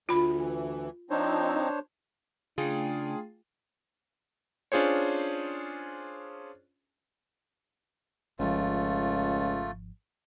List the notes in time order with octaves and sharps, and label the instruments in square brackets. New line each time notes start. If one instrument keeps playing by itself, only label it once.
[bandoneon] D2 [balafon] F4 B5
[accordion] E3
[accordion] F3 C4 D#4 [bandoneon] D4 C5 C#5
[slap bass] C#3 [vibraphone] A3 G5 [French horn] D4 [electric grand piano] F4 G#4
[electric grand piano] C#4 D4 F4 G#4 C5 C#5
[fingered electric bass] G#1 F3 [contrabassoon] C#2 [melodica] A3 F4